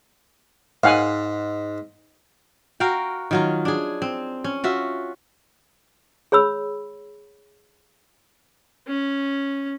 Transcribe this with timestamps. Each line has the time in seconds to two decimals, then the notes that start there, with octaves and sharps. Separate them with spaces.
0.84 G#2 F5 F#5 G#5
2.80 F#4 A#4 F5 G5
3.31 D#3 F#3 F4
3.65 D4 G#4
4.02 C4
4.44 C#4
4.64 F4 F#4 E5
6.32 G#4 C#5 B5 E6
8.87 C#4